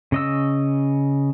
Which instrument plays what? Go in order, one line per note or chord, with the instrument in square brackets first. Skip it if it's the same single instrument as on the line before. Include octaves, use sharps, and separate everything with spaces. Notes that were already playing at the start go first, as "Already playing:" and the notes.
[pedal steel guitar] C#3 D#5 E6